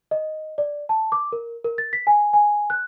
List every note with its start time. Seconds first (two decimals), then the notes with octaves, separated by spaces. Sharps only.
0.11 D#5
0.58 D5
0.89 A5
1.12 D6
1.32 A#4
1.64 A#4
1.78 A6
1.93 B6
2.07 G#5
2.33 G#5
2.70 F#6